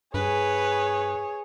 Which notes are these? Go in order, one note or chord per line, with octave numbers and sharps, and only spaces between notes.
G2 G#4 B4 C#5